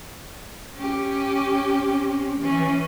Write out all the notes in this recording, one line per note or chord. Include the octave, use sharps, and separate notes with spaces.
C#4 G4
E3 C#4